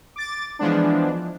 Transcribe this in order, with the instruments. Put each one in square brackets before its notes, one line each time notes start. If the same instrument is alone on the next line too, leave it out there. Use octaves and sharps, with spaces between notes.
[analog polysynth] D6 A6
E3 F3 G#3 B3 D4